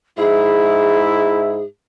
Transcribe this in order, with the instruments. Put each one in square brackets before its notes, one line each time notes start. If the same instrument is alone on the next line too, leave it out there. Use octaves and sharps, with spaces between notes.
[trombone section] G#2 E4 [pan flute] G#4